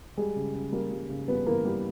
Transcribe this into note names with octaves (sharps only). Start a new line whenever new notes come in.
G3 G#3 G#4
C#3
C#3
G3 A#3 A#4
G3
C#3
G3 B3 B4
E3 A#3 A#4
G3